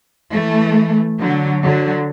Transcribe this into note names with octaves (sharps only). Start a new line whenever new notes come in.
E3 A3
D3 F#3
D3 F#3